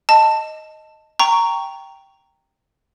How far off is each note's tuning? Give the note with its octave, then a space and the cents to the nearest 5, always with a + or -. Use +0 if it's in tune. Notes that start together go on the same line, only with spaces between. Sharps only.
D#5 +0 A5 +10
G5 +0 A#5 -10 C#6 +5